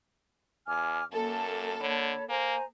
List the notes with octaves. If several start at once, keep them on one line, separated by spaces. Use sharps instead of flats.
E2 G#5 D6 F6
F#2 A#3 A4 A5
D3 C#5 B5
A#3 C5 G#5 A#5